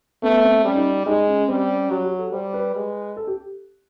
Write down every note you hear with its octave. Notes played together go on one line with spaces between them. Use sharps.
A3 B3
C4
G3 C#4
D#4
D#4
G#3 D#4
C#4
G3 C4
C#4
F#3 F#4
G4
A4
G3 C5
B4
G#3
A4
G4